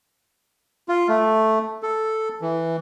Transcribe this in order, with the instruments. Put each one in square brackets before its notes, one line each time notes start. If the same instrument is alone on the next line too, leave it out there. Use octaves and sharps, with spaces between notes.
[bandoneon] F4
A3
A4
E3